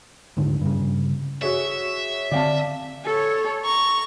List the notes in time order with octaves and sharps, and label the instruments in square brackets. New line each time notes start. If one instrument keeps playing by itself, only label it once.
[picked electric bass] D2 G#2 D3
G2 C#3
[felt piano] F#4 G#4 C#5 [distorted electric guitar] E5
[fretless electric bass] D3 C4 [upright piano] D5 F5 A5
[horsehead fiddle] A4 C#5
[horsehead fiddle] A#5 [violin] C#6